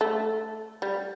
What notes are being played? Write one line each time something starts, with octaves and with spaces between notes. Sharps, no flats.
A3
G3